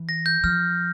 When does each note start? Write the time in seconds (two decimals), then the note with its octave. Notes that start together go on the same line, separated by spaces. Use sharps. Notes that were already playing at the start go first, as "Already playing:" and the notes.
Already playing: E3
0.09 A#6
0.26 G6
0.44 F3 F6